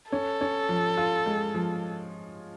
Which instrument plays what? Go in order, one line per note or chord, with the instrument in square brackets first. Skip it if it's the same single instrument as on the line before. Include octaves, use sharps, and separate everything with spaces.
[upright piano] C#4 [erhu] A4
[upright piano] C#4
F3
F4
G#3
F3